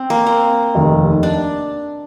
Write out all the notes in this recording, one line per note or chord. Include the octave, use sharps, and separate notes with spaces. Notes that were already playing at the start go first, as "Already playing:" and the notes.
Already playing: C4
A#3
C4
F1 D#2 D#3
D4